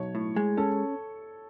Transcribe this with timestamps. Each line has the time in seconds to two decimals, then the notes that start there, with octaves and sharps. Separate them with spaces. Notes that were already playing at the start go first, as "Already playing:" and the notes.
Already playing: B1 C#5
0.15 A2
0.36 G#3
0.57 C#4 A4